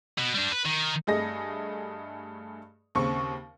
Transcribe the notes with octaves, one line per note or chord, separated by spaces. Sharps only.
B2
G3 D4
B4
D#3
G2 A3 G#4 D#5 A#6
D#2 C#3 C4 C#6